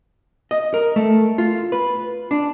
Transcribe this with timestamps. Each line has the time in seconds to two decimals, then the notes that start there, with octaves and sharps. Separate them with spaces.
0.51 D#5
0.74 A#4
0.96 A3
1.38 F4
1.72 B4
2.31 D4